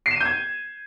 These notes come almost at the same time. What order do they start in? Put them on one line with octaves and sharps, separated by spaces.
C7 E7 D#7 G6 G#6